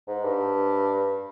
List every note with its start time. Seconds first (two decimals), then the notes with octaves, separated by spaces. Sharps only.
0.08 G#2
0.24 G2